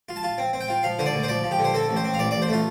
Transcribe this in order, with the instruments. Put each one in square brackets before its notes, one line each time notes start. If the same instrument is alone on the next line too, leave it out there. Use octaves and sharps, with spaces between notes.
[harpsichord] F4
A5
F4
C4
C4
G5
F4
F3 F5
D3 C5
D5
D2
C5
F3 D5
F3
G4
D3
C5
C4 A4
A1
C5
C4
F5
A1 D5
A1 D5
C5
A3 F4